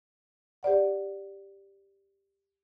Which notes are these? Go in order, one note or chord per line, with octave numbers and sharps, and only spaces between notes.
G4 C5 D5 F#5